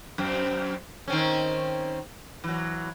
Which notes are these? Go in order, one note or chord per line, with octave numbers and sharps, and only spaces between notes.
F#2 C4
D#3 C4 C#4
E3 F#3